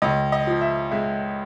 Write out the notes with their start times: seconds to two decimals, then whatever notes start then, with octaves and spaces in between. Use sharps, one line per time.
0.02 C#2 D#5
0.32 D#5
0.47 F3
0.61 E5
0.91 G#3 E5